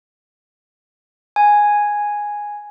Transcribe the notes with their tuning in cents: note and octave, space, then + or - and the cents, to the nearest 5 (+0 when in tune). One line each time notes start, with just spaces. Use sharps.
G#5 +0